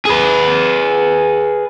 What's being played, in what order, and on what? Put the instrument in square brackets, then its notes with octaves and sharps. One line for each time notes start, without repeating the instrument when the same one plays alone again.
[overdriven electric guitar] G#4 B4